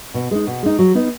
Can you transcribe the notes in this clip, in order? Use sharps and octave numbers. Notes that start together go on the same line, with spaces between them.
B2
G#3 D#4
B2
G#3 D#4
F#3
B3 D#4